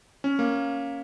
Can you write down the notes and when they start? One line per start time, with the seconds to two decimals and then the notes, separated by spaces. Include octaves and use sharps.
0.24 C#4
0.39 A#3